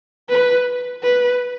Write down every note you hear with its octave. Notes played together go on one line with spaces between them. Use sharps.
B4
B4